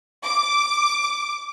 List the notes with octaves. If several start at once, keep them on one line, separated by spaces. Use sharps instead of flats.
D6